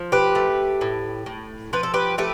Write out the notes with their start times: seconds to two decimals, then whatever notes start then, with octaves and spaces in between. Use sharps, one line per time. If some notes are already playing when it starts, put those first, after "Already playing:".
Already playing: F3
0.12 G4 B4
0.35 A3
0.81 A2
1.26 A2
1.73 F3 B4
1.83 A4
1.94 G4 B4
2.18 A3 G4 B4